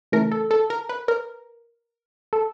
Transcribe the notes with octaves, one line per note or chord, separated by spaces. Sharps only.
C#3 E3 A3 A#4
A4
A4
A#4
B4
A#4
A4